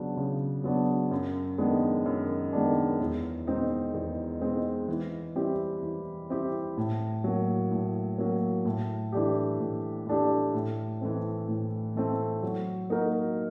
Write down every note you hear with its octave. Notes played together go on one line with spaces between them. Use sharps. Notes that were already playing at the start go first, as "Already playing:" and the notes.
Already playing: C#3 F#3 B3 D4
C#3
F#3 B3 D4
F#2
D#3 G#3 B3 D4
F#2
D#3 G#3 B3 D4
E2
B2 G#3 C4 D#4
E2
B2 G#3 C4 D#4
E3
G3 C4 E4 G4
E3
G3 C4 E4 G4
A2
F#3 A#3
A2
F#3 A#3
A2
E3 A3 D4 G4
A2
E3 A3 D4 G4
A2
E3 A3 C4
A2
E3 A3 C4
F#3
A#3 D#4 F#4 A#4